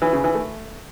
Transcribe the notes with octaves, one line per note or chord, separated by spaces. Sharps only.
E3
C#3
E3
A3